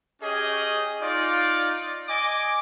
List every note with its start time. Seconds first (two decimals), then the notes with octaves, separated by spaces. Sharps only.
0.22 C#4 G4 G#4 D#5
1.02 D#4 F4 D5
2.08 D#5 G#5 D6